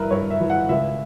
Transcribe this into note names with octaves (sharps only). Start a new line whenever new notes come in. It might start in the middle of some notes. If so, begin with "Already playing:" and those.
Already playing: G2 E3 A#4 B4 E5
G2 C#5
E5
E3
F#5
C#2 E5